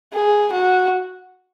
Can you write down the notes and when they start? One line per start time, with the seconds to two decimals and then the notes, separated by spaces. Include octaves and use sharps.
0.13 G#4
0.52 F#4